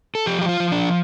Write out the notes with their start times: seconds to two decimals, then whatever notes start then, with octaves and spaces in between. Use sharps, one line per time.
0.15 A4
0.26 F3 G4
0.41 G4
0.49 F4
0.60 F3
0.72 D4